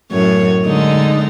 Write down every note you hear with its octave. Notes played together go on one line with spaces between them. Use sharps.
F#2 A2 C#5
D3 G#3 D#4